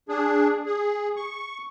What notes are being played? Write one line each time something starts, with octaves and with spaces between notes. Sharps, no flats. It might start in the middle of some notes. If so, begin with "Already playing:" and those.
D4 G#4
G#4
C#6